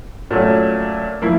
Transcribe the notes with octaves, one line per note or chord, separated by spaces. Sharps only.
A#2 F#3 A3 C#4
F3 A#3 E4